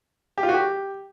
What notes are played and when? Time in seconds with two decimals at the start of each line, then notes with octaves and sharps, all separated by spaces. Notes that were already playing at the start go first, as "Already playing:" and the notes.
0.38 G4
0.43 F4
0.49 F#4
0.54 G4